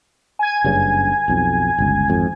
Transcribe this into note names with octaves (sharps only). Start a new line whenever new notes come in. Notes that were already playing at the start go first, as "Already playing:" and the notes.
G#5 G#6
F#1 G2 C#3
B1 F2
G1 C#2
G#1 F2